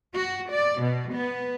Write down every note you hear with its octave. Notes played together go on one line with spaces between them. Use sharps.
F#4
D5
B2
B3